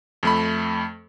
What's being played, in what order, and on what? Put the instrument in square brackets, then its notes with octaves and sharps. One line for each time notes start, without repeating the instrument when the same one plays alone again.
[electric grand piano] F2 A3 B5